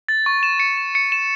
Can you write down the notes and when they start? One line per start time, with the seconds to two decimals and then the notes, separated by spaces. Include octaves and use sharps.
0.09 A6
0.26 C#6
0.43 E7
0.60 C#7
0.77 E7
0.95 C#7
1.12 E7